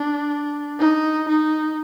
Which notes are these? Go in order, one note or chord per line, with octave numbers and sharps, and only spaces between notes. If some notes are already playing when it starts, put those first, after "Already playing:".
Already playing: D4
D#4
D#4